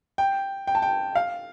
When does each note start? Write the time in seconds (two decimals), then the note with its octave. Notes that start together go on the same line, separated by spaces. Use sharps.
0.18 G5
0.67 G5
0.75 A5
0.82 G5
1.15 F5